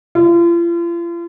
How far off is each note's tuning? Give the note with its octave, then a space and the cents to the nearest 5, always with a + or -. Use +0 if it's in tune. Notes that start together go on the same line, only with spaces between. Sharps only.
F4 -40